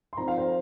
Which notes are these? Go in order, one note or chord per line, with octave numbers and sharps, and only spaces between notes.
C6
F3 C4 D#4 A#5
F5
C5